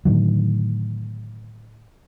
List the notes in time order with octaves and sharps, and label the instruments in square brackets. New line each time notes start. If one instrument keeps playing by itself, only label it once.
[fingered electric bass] A2 D3 D#3 F#3